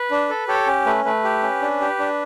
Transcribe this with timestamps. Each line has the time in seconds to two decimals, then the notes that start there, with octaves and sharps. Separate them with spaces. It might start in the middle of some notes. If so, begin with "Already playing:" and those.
Already playing: B4
0.11 D4
0.30 A4
0.48 G4 A4 C#5
0.67 C#4
0.86 A3 B4
1.05 A3 B4
1.24 G4
1.43 C#4
1.62 D4
1.81 G4
1.99 D4